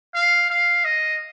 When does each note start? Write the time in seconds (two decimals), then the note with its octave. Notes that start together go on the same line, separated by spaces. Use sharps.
0.15 F5
0.50 F5
0.85 D#5